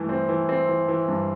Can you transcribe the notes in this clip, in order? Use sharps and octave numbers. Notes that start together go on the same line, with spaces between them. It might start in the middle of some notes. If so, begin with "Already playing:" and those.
Already playing: G2 E3 A3
C4
E3
C4
E3
E3
G2